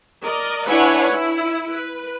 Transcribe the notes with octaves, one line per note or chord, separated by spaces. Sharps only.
A#4 D5 D#5
D4 E4 B4 C#5 F#5 G#5
E4
B4